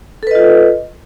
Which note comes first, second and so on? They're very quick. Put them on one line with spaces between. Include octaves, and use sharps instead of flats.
A4 B4 D#5 F4